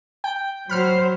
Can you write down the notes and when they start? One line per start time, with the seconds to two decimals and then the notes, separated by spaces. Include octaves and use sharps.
0.24 G5
0.69 F#3 C5 B5 F6 C7